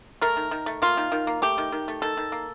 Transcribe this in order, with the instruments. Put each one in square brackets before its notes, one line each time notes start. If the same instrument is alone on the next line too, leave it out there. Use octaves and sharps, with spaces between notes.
[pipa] A3 A#4
D#3
D#3
A3
A#3 F4
D#3
D#3
A#3
A3 G4
D#3
D#3
A3
D#3 A4
D#3
A#3